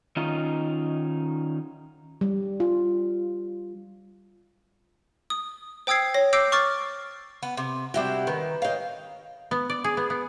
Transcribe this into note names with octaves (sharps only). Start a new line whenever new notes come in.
D#3 C#4 D#4 F4
G3
F4
D#6
C5 G5 D#6 E6 G#6 C7
C#5 A#6
D6 E6 G6 A#6 C7 D7
C#6 D6 F6 A6
B3
C3
C3 G3 D4 E4 F#4 G5
D#3 B4
C#5 D#5 F5 G5
B3
D5
G#4
B3
B3